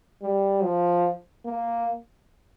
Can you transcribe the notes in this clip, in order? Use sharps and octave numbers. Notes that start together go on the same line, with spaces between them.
G3
F3
A#3